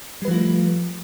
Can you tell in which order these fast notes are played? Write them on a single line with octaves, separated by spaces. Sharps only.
G3 B4 F3 F4 A3